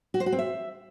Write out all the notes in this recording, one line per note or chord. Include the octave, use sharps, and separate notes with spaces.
F#4
C5
F#4
C4
E5